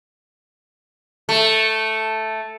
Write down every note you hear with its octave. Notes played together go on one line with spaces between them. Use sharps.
A3